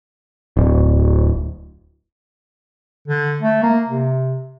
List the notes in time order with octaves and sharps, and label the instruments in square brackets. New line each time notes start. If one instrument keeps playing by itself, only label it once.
[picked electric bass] D1
[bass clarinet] D3
A3
A#3
C3